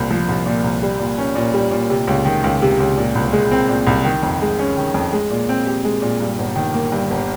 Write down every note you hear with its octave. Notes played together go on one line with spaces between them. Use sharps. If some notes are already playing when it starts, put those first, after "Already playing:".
Already playing: C2 A#2
F3
C2
A#2
C2
G3
A#2
C#4
A#2
G3
A#2
C3
C#2
D#3
C#2
C3
C#2
A#2
C2
G#3
C4
A#2
C2
D#3
F2
G#3
C#4
D#3
F2
G#3
A#2
C4
G4
G#3
A#2
G2
G1
D#3
A#3
G2
G1